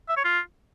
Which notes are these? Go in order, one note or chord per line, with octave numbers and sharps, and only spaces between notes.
E5
C#5
F4